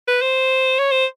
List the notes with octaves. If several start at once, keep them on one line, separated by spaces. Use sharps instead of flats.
B4
C5
C#5
C5